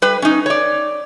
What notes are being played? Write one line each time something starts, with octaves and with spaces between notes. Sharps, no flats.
G3 B4
C#4 D#4
C#5 D5